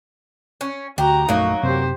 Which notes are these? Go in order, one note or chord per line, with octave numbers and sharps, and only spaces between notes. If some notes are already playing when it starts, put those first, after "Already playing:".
C#4
D2 F#4 G4 A#5
A#1 F#2 F#3 A3 A#3 D#4
F#2 C3 C4 G4 C5